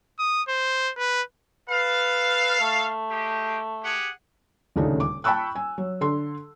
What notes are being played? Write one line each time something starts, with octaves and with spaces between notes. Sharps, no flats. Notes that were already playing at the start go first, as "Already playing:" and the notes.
D#6
C5
B4
A4 B4 F5
A3
G#3 G4
G4 G#4 F#5
D#1 D2 C#3 A3 D4 D#4
D6
G5 A5 B5 C#6 E6 F#6
G#5
F#3
D3 A4 C6